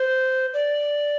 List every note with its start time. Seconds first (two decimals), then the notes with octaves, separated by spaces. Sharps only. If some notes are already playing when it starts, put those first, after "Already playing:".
Already playing: C5
0.54 D5